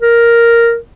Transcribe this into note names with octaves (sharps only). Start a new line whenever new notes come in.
A#4